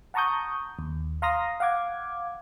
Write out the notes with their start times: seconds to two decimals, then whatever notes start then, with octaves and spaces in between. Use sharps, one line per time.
0.14 F#5 A5 A#5 C#6 D#6 G6
0.79 D#2
1.22 F5 A#5 C6 D#6 F6 A#6
1.60 F5 F#5 D6 G#6